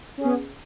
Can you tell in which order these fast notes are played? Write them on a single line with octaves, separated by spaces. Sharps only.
C#4 G#4 B3